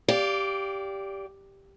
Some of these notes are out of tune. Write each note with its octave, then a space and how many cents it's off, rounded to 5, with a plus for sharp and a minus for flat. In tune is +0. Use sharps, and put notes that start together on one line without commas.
G4 +0 D5 -20 F5 +0